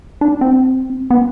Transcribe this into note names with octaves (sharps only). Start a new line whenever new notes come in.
D4
C4
B3